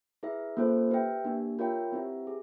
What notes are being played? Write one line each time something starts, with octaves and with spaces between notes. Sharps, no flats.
E4 G#4 B4 E5
A#3 C#4 F4 A4 C5
G4 B4 E5 G5
A#3 D4 G4
F4 A#4 C#5 E5 G5
C4 E4 G4 B4 E5
G#4